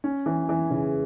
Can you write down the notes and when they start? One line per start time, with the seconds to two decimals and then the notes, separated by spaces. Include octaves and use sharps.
0.04 C#4
0.26 E3
0.49 E3
0.71 C#3